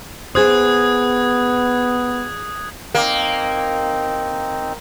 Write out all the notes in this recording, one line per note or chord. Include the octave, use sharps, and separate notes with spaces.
B3 G#4 C5 D#6 F#6 G#6
A#3 C4 D#4